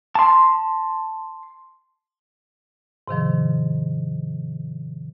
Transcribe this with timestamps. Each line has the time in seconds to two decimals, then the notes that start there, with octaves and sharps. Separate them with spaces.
0.15 A5 C6
3.08 G#2 C3 D#3 F3